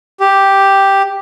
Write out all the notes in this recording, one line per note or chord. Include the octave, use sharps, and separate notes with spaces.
G4